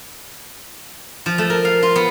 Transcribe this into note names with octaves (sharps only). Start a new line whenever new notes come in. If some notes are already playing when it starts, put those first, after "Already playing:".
F3
A3
A#4
F5
F4
B3